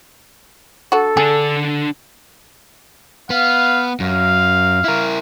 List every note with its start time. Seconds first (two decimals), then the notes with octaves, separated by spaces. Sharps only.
0.92 D3 F#4 A4
1.17 D3 D4 G#4
3.30 B3 F5
4.00 F#2 F5
4.84 E4 A#4